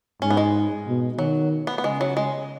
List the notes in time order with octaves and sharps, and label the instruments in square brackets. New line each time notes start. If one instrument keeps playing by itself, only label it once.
[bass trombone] G#2 [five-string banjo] C#4
[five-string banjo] B3
G#3
[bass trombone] B2
[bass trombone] D#3 [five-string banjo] F#3
[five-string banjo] B3
B3
[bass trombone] C#3 [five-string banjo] G#3
[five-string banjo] F#3
G#3